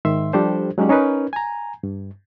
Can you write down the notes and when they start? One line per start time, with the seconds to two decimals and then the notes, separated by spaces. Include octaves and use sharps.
0.05 G#2 D#3 E5 C6
0.33 F3 G3 D4 G4 A4 C5
0.78 F#3 G#3 C#4 D#4 G4 D5
0.89 C#4 D#4 A#4 B4
1.33 G#5 A#5
1.83 G2